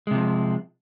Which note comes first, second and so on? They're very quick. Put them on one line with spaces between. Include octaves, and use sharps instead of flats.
G#3 C3 F3